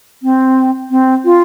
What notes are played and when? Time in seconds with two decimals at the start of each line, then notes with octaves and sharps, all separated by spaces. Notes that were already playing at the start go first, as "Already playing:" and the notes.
0.23 C4
0.91 C4
1.25 F4